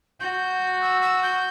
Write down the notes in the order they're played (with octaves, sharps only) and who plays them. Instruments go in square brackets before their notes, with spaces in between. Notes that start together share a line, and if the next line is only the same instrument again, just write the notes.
[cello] F#4 [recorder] G6
[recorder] E6
E6
G6